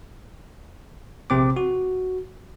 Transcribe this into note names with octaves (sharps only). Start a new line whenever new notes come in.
A#1 C3 C4 D6
F#4